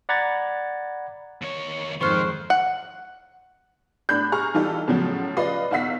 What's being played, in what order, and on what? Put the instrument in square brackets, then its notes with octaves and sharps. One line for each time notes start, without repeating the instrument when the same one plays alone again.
[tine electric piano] D5 F#5 A#5 B5 G#6 A6
[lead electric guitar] D#2 C#5
[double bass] F2 G#2 [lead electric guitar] D#3 [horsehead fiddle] C5 [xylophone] C#6 F6 F#6
[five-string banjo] F#5
[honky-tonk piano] A2 D4 B5 F#6 G6
G#4 A#5 C#6 F6
E3 G3 D#4 F4 G4 A4
A2 C#3 F3 F#3
F4 B4 D5 D#5 C7
B1 E2 F5 F#5 E6 B6